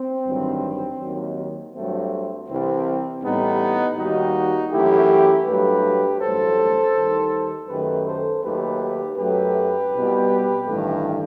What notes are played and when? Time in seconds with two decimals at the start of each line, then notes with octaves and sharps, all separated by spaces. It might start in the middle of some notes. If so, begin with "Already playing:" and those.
Already playing: C4
0.25 A1 G2 D#3 F#3
1.00 D#2 D#3 F#3
1.74 G2 F#3 A3 C4
2.48 C2 C3 E3 G3 C4
3.22 A1 A2 G3 B3 D#4
3.97 D#2 D#3 G3 D#4 F#4
4.71 F#2 E3 A3 E4 G4
5.46 G2 F#3 A3 G4 B4
6.19 A1 G2 F#3 A3 A4 C5
6.94 D#2 D#3 G3
7.68 F#2 D#3 A3 G4 B4
8.06 A4 C5
8.42 D#2 D#3 F#3 A3 G4 B4
9.17 F#2 F#3 A3 G4 B4
9.92 C2 B2 G3
10.65 A1 G2 D#3 A3